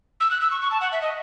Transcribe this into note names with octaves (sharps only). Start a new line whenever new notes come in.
E6
F#6
E6
C#6
C#6
A5
F#5
E5
D#5